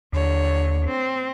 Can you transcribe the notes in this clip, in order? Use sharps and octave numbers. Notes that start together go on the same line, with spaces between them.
D#2 D3 C#5
C4